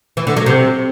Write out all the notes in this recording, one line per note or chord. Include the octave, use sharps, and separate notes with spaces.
E3
D3
F#3
C3